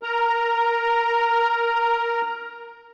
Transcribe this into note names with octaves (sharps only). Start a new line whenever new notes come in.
A#4 A#5